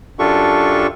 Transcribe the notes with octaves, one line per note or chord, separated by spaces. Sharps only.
F#2 D4 F4 G4 A4 C#6